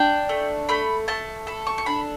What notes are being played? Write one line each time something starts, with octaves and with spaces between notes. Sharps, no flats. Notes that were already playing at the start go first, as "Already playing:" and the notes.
Already playing: D4 G5
A3
A3 B5
A3 A5
A4 B5
C#6
C#6
D4 B5